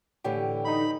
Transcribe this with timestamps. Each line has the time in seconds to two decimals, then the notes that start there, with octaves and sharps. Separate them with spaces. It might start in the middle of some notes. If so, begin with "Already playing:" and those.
0.24 A2 D3 E3 G4
0.65 D#4 B5